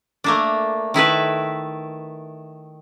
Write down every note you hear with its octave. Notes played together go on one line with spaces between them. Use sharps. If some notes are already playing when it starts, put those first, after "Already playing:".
A3 A#3 D4
D#3 E4 A4 B4